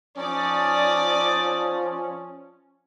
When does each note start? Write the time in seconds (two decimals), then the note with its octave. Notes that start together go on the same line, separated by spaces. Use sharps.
0.18 F3 C#4 D#4 D5 A5 D#6